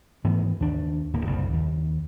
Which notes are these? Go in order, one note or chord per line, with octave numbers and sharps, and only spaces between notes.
G#2 E3 A3 B3
D#2 D4
D1 A#3
F#1 C2 G3
D#2